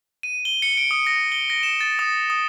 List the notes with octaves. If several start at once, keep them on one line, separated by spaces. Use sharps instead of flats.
D#7
G7
C#7
D7
D#6
A#6
G7
A#6
E7
A6
D#6
D#6